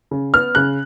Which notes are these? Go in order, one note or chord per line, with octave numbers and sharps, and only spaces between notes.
C#3
B3 F6
C#3 F#6